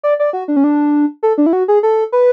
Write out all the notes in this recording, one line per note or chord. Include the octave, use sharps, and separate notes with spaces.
D5
D5
F#4
D4
C#4
D4
A4
D4
E4
F#4
G#4
A4
B4